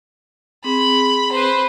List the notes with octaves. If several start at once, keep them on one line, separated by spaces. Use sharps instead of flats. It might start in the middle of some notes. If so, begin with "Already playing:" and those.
C4 G#4 B5
B4 C5